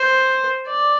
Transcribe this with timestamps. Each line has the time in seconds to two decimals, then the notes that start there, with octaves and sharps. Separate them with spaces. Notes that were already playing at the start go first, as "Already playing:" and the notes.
Already playing: C5
0.69 D5